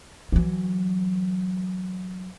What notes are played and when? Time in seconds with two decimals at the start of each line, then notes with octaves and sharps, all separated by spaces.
0.32 E3 F#3